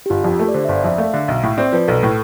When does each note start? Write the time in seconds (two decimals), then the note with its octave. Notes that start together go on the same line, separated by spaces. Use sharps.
0.06 G4
0.10 G1 F4
0.24 F2 G4
0.39 A3 A4
0.48 D5
0.54 D3 C5
0.65 E5
0.68 G1 D5
0.84 F2 E5
0.98 A3 F5
1.14 D3 F5
1.28 B1 E5
1.43 A2
1.58 C4 D5
1.72 F3 B4
1.88 B1 A4
2.03 A2